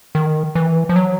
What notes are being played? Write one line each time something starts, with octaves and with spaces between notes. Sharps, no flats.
D#3
E3
F3
F#3